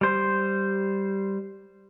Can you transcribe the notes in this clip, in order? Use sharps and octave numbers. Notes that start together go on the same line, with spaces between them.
G3 C5